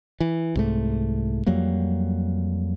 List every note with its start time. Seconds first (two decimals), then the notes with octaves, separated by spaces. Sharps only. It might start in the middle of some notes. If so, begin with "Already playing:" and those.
0.20 E3
0.56 C2 G#2 A3
1.46 F2 F#3 G3 A#3